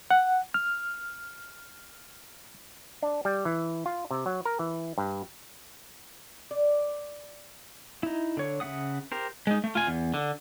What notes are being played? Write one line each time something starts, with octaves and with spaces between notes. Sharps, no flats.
F#5
F6
D4
G3
E3
F4
C3
F#3
A#4
E3
G2
D5
D#4 E4
D3 C#5
C#3 C4 E5 F#5 D#6
G4 A#4 C5
G#3 D#4
A3
F4 G#5
E2
D3